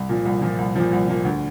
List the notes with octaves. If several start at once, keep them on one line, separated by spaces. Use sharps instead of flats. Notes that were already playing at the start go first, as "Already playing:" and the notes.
Already playing: C2
A#2 F3
C2
A#2 F3
C2
A#2 F3
C2
A#2 F3
D2